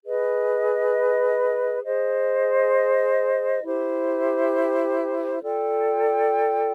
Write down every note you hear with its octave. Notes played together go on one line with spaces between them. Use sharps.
G#4 B4 D#5
G#4 C5 D#5
E4 G4 C5
F4 A4 D5 G5